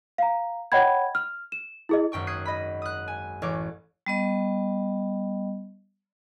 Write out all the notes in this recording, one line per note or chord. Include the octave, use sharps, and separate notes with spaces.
F5 A#5
C#5 D#5 F#5 G5 B5 G#6
F6
E7
E4 G#4 D#5
G#1 F#2 G5 C#6
D#6 F#6 G#6 C7
D#5 B5
D#6 F#6
G#5
A1 C#5 D6
G3 B3 D#5